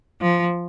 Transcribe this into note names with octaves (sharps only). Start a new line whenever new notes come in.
F3